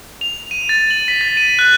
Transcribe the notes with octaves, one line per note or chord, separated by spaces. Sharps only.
F7
D#7
A6
F#7
B6
A6
D#7
F#6